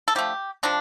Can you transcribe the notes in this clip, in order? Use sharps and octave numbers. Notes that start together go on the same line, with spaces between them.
A4
D3 F3 A3 G4
C3 F3 D4